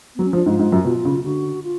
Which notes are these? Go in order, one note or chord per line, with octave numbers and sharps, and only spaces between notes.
F#3 B3
C#4
F3
D4
G#2 F4
G#2
F#2
B2 F4
C#3
D3 F#4
F4